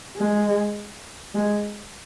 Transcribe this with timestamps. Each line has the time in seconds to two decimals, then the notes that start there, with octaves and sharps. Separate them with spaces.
0.17 G#3
1.34 G#3